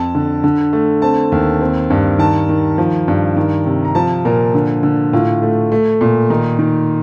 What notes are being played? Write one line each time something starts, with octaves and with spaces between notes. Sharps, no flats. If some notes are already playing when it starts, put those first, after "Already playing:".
Already playing: F2 A5
D3
D3
A3
C4 A5
D#2
C4
G2
D#3 A5
D#3
F3
G2
D#3
C3
A#5
F3 A5
A#2 A#4
D3
D3
A2 F4
A3
A3
A#2
D#3 D#4
D#3